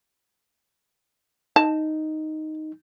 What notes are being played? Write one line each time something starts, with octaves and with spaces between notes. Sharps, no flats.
D#4 A5